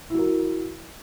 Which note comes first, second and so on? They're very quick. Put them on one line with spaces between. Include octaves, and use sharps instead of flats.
E4 F#3 A#4